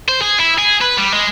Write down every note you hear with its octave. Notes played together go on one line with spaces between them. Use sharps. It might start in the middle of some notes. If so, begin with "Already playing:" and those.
C5
G#4
E4
G#4
B4
G3
G#3